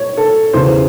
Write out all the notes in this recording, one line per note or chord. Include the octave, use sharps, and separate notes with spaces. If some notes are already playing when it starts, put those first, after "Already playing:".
Already playing: C#5
A4
E2 C#3 E3 C5